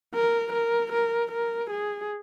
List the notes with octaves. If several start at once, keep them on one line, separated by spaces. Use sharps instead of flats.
A#4
A#4
A#4
A#4
G#4